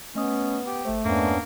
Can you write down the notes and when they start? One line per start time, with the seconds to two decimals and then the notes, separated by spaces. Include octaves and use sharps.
0.15 A3 B3 C#4 D#5 D#6
0.66 G4
0.85 G1 A3 C5
1.05 E2 G2 A#3 B3 C#4 D4